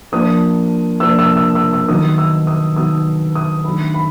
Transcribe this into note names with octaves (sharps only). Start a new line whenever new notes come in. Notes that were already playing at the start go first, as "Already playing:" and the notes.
F3 A#3 D4 D#6
F3 A#3 D4 E6
E6
E6
E6
E6
D#3 F#3 B3 D#4 D#6
E6
D#6
D#3 F#3 B3 D#4 D#6
D#6
D#3 F#3 A3 D4 B5
B5